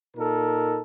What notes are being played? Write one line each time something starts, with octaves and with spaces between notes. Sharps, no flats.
A#2 D#4 A4 A#4